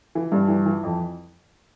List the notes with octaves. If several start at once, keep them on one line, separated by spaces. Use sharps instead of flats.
E3
G2
E3
E3
F2